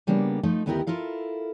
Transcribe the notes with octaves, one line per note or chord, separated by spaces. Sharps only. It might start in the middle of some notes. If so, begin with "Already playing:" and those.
C#3 G3 A#3 B3 D4
F3 A3 D#4
D2 D#3 B3 E4 G4 A#4
E4 F4 A4 A#4 F5